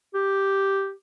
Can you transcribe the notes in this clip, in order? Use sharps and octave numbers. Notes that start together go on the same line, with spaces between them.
G4